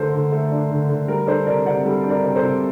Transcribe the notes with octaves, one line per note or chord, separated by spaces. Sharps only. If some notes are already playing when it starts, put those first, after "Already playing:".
Already playing: D3 A3 D4 A4 A#4 C5
D3
A3 A4
D4
D3
D3
G3 A#4
D4 A4 C5
C3 A#4 D5
C3 D5 F#5
G3 A4
D4
A#4 D5
C3
A4 C5
C3